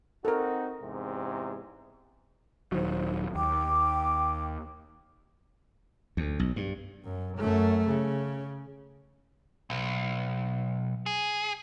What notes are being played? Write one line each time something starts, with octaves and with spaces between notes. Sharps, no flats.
C4 D#4 F#4 A4 A#4
E2 G#2 C3
D#1 D#3 F#3 C5
D#2 G5 D6
D2
B1
G2
F#2
F#2 A3
C#3
B1
G#4